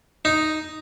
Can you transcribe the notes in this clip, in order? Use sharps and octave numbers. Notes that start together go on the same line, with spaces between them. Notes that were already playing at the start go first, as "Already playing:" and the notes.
D#4